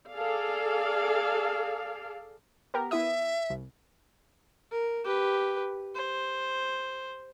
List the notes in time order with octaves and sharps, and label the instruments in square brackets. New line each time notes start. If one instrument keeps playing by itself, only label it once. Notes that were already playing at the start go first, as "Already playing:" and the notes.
[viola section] G#4 A4 D5 F5
[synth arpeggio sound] B3 G4 A#4
[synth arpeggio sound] B3 E4 D#6 [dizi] E5
[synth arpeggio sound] C2
[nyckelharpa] A#4
G4 B4
C5